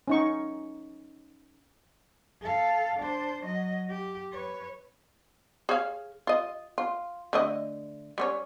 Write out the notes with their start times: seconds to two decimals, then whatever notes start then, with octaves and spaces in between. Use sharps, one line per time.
0.08 C#4 D#4 C#6
2.41 A4 F5
2.99 D4 C5
3.44 F#3 D#5
3.90 G4
4.32 B4 C#5
5.69 G#4 C#5 F5
6.27 F4 D#5
6.78 F4
7.33 D3 A3 D#5
8.18 G3 C#4 C#5